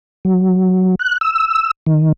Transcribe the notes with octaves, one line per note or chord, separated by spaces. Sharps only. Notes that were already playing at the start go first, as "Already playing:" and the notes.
F#3
F#6
E6
D#3